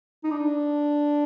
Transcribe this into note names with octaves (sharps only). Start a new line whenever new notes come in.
D#4
D4